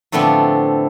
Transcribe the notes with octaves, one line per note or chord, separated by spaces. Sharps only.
A2 D3 F3 A3 B3 C4